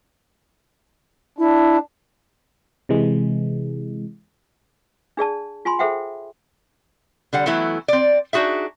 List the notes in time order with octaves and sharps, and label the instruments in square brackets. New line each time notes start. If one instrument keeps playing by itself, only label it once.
[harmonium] D4 [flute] E4
[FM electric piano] C3 E3 G#3
[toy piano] D4 G#4 D5 A5
F4 G#5 B5 C6
G#4 A4 C5 E5 F#5 G5
[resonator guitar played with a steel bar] D3 G3 F#5
E3 F#3 A3 B3 E4
C4 D5
D4 D#4 F#4 G#4 E5